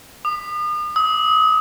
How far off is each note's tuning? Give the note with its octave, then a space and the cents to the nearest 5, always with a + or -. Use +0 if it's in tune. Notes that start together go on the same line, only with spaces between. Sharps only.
D#6 -40
D#6 +40